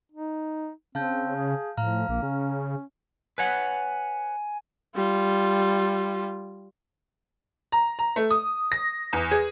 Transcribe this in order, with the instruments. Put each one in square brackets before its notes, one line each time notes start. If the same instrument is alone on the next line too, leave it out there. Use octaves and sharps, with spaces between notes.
[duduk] D#4
[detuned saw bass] C#3 [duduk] C4 [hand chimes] F5 A5 G6
[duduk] G#4
[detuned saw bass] A2 [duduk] F3 [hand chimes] F5 A#5 F6
[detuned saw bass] A#1 [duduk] A#3
[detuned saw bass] C#3 [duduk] C#4
[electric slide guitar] B4 C#5 F#5 [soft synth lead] G#5
[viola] G3 F4
[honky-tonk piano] A#5
A#5
A3
D#6
A#6
E2
G#4